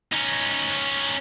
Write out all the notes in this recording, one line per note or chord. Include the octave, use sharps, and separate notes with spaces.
C#4 D#4